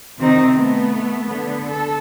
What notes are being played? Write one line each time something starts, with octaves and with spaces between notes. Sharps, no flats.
C3 D#3 C4 D#4
A3 B3
D3 B3
A4